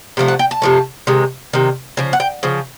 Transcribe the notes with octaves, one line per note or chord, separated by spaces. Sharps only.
C3 F3 A3
F#5
G5
A5
C3 F3 A3
C3 D#3 G#3
C3 D#3
C#3 F3
F#5
G5
C#3 F3